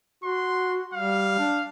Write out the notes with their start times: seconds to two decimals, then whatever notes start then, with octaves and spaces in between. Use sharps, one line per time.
0.24 F#4 C6
0.94 G3 F5
1.39 D4